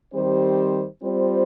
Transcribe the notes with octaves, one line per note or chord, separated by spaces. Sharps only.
D#3 G3 C4 G4 C5
G3 C4 F4 C5